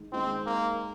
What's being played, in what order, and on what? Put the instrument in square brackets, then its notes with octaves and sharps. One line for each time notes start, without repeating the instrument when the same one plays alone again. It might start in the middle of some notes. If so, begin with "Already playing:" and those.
Already playing: [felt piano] D#3 G#3 D#4
[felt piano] D#3 G#3 D#4 [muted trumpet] C4
[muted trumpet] A#3